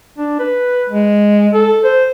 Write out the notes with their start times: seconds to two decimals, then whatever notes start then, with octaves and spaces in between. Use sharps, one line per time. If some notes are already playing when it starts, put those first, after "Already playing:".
0.18 D4
0.39 B4
0.89 G#3
1.54 A4
1.84 C5